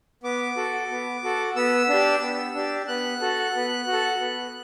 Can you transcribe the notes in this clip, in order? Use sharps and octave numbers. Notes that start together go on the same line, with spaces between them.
B3 D6
F#4 A4
B3
F#4 A4
B3 E6
D4 G4
B3
D4 G4
B3 F#6
F#4 A4
B3
F#4
A4
B3